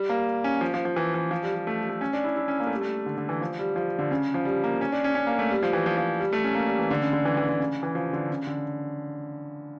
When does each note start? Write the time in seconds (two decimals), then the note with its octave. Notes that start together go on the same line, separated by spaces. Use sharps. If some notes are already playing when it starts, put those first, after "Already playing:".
Already playing: G3
0.10 A#3
0.44 C#4
0.61 F3
0.74 F3
0.85 F3
0.96 E3
1.14 E3
1.31 F3
1.43 G3
1.55 G3
1.67 A3
1.78 G3
1.89 A3
2.01 C#4
2.13 D4
2.24 E4
2.36 E4
2.48 C#4
2.60 A#3
2.67 A3
2.74 G3
2.81 A3
3.06 D3
3.17 D3
3.29 E3
3.41 F3
3.59 G3
3.76 F3
3.99 D3
4.11 C#3
4.34 F3
4.45 G3
4.64 A#3
4.81 C#4
4.92 D4
5.04 C#4
5.15 C#4
5.27 A#3
5.39 A3
5.51 G3
5.63 F3
5.73 E3
5.86 F3
5.98 F3
6.20 G3
6.33 A3
6.44 C#4
6.55 A#3
6.67 G3
6.79 E3
6.91 D3
7.02 C#3
7.13 D3
7.25 E3
7.37 E3
7.49 D3
7.59 C#3
7.83 E3
7.95 F3
8.13 D3
8.31 C#3
8.47 D3